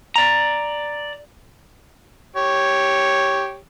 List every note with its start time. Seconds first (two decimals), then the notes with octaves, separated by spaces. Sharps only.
0.16 D5 A#5
2.36 G4 C#5